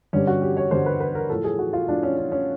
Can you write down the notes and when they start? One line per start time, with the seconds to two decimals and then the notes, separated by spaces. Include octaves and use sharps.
0.13 G2 D3 G3 C#4
0.27 F#4
0.42 G4
0.57 C#5
0.71 G2 D3 G3 C5
0.86 B4
1.00 B4
1.15 A#4
1.30 A2 F3 A4
1.44 G#4
1.59 F#4
1.73 F4
1.88 A2 F3 D4
2.03 C#4
2.17 C#4
2.32 C#4